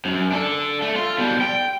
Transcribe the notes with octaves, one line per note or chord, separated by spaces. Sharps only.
F#2
D4 A4
A3
F4
B2 G3
G5